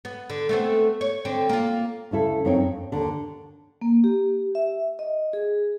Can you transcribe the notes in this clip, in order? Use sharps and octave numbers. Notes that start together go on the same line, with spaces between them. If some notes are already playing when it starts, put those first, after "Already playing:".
B3
D3
A3 B3 C4
C#5
D3 C4
A#3 F4
D2 C#3 E4 A4
F#2 C4 D#4 C#5 G5
F2
D#2 D3
A#3
G4
E5
D#5
G#4